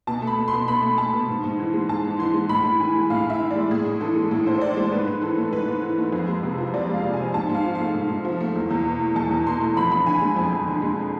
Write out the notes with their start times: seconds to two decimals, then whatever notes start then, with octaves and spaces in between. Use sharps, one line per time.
0.07 B2 A5
0.22 A3
0.27 B5
0.38 A3
0.48 C6
0.53 B2
0.68 B2 B5
0.83 A3
0.98 A3 A5
1.13 B2
1.29 G#2
1.44 G#2
1.59 E3
1.74 G#3
1.89 G#2 A5
2.05 G#2
2.19 E3 C6
2.34 G#3
2.49 A2 B5
2.65 A2
2.80 E3 G#5
2.95 G#3
3.10 A2 F5
3.25 A2 E5
3.40 E3
3.51 D5
3.56 G#3
3.71 A2 G#4
3.85 A2
4.01 E3 A4
4.16 G#3
4.31 A2 A4
4.46 A2 C5
4.58 C5
4.61 E3 D5
4.76 G#3 C5
4.92 G#2 B4
5.08 G#2
5.22 E3 A4
5.37 A3
5.52 G#2 B4
5.68 G#2
5.83 E3
5.98 A3
6.12 F2
6.28 G#3
6.43 C3
6.58 F3
6.74 F2 D5
6.89 G#3
6.94 F5
7.04 C3
7.14 G#5
7.19 F3
7.34 G#2 A5
7.49 G#2
7.55 F5
7.64 F3
7.75 A3 F5
7.95 G#2
8.10 G#2
8.25 F3
8.40 A3
8.56 E2
8.71 E2
8.86 B2
9.01 A3
9.16 E2 A5
9.31 E2
9.47 B2 C6
9.61 A3
9.77 F2 B5
9.91 F2 B5
10.06 D3 G#5
10.21 G#3
10.36 F2
10.52 F2
10.68 D3
10.82 G#3